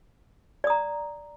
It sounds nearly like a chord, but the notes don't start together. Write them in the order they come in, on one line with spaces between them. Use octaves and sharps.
D5 D#6 A#5